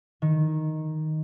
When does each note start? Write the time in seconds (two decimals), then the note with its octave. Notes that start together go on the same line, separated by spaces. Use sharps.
0.22 D#3